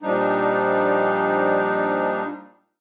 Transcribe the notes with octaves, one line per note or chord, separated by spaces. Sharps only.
A#2 F3 G3 D4 D#4